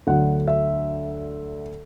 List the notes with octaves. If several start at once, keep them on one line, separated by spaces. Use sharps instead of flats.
D2 D3 F#3 F#5
E5